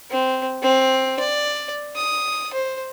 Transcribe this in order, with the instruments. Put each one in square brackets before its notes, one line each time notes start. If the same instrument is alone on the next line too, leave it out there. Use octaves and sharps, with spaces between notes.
[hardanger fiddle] C4
C4
D5
D#6
C5